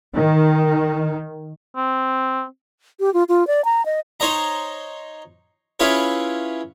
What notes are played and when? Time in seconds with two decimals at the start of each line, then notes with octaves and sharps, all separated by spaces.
0.14 D#3
1.76 C4
3.00 G4
3.14 F4
3.29 F4
3.47 D5
3.65 A#5
3.86 D#5
4.20 D#4 C5 C#5 D#5 A#5
5.80 C#4 E4 F4 G#4 B4 C#5